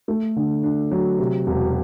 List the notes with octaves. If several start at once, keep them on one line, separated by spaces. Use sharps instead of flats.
A3
D3
D4
F#3
C3
E1